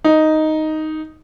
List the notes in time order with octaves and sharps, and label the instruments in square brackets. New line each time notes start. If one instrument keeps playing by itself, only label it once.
[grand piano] D#4